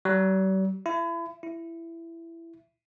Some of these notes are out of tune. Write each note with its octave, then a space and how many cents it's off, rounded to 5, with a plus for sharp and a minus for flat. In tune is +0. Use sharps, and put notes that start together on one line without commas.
G3 -45
E4 +35
E4 +15